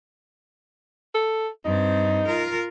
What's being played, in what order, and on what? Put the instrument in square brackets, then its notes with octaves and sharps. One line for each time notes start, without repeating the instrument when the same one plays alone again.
[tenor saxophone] A4
[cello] G2 C4 [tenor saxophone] D#4
[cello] F4 A#4